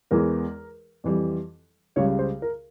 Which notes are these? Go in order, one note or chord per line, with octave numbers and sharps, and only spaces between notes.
E2 E3 G#3 A#4
F2 E3 G3
C#2 C#3 G3 C#5
C5
A#4